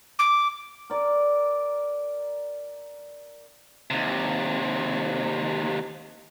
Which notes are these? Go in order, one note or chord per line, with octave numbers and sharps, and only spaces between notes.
D6
A#4 D5
D#2 C3